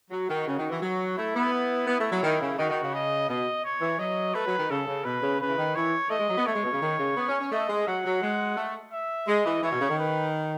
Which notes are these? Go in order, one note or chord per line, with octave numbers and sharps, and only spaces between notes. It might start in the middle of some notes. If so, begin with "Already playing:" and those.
F#3 F#4
D#3
C#3
D#3
E3
F#3 F#4
A3 E4
B3
E4
B3
A3
F#3
D#3
C#3
D#3 F#4
D#3
C#3
D#5
B2 D#5
C#5
E3
F#3 D#5
A3 B4
F#3
D#3
C#3 A4
C#3
B2 B4
C#3
C#3 B4
E3
D#3
E3 C#5
A3 D#5
G#3
F#3
B3
A3 C#5
G#3
B2
C#3
D#3
C#3
B3
C#4
C#4
A3 D#5
G#3
F#3 F#5
F#3
G#3
A3
E5
G#3 D#5
E3
E3 C#5
B2
C#3
D#3
B4